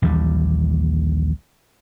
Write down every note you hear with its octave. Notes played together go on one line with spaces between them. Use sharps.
A#1 D#2 E3 G3